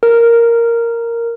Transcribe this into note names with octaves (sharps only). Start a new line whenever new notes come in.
A#4